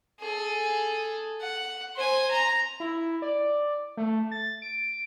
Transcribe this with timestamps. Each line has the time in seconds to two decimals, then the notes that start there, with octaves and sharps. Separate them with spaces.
0.21 G#4 A4
1.41 F#5
1.96 C5 G#5
2.31 A#5
2.80 E4
3.22 D5
3.97 A3
4.31 A6
4.62 D7